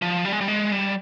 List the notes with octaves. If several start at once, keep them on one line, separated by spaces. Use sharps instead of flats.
F3
G3
G#3
G3
G#3
G3